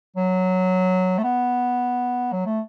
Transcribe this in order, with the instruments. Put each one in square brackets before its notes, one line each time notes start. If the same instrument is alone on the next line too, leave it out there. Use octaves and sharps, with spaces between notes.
[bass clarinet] F#3
A3
B3
F#3
A3